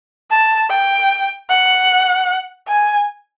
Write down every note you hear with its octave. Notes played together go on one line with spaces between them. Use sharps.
A5
G5
F#5
G#5